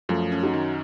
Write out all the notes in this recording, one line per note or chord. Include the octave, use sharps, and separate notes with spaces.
F#2 F3 A3
C#4
D#4 F#4
D#3